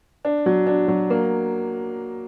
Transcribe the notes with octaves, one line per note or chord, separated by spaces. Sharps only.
D4
F#3
D4
F#3
A#3